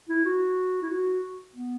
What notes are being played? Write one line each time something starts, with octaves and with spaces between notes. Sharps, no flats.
E4
F#4
E4
F#4
B3